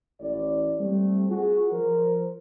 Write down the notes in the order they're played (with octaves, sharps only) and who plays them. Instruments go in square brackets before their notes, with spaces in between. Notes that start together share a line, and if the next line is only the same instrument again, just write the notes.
[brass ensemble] A1 A2 D5
G3 A3 C4
F4 F#4 G#4
F3 A#4 C5